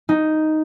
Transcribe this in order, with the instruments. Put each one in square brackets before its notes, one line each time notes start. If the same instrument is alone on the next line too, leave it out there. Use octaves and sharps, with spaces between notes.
[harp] D#4